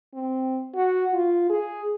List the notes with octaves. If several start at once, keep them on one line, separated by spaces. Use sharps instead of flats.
C4
F#4
F4
G#4